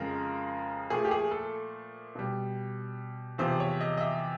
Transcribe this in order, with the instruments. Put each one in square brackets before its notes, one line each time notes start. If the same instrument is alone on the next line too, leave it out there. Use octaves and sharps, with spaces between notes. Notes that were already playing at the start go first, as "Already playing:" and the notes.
Already playing: [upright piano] F2 C#3 F3 G#3 A#4
A#2 F3 A3 G#4
G4
G#4
A4
B2 G3
E2 C3 F3 C5
C#5
D#5
D#5
E5